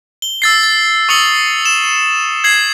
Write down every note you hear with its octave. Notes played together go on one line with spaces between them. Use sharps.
G7
E6 A6 C7
A6
C#6 D#6 E6 C#7 F#7 G7
E7
G#6 C7 F#7